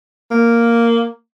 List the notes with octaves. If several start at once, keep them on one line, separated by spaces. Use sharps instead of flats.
A#3